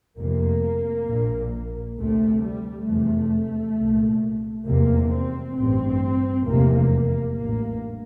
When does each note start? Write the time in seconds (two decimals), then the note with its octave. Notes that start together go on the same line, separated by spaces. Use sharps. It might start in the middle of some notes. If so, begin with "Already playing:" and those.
0.17 F1 F2 C3 A#3
1.07 A#1 A#2
1.97 D2 C3 A3
2.42 G3
2.87 F1 E2 C3 A3
3.77 C2 A#2
4.66 F1 E2 C3 A#3
5.11 C4
5.56 A1 G2 C4
6.45 F1 E2 C3 A#3
6.76 A#3
7.05 A#3
7.35 A1 G2 A#3